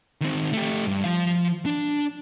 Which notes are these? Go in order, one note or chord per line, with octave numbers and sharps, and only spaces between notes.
D#3 C4
A3 G4
G2
F3 F5
D4